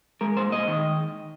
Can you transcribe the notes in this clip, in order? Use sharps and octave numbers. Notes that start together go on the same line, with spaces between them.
G#3 A#4
A#2 C5
G#3 D#5
D#3